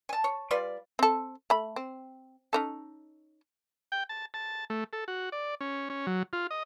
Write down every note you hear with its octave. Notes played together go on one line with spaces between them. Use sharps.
G#5 A5
C#5
G3 F4 B4 D5
C4 A4
A3 B5
C4
C#4 D#4 A4
G5
A5
A5
A3
A4
F#4
D5
C#4
C#4
F#3
F4
D#5